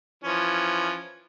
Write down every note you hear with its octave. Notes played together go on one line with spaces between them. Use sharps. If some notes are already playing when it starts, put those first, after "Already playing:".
E3 F3 C#4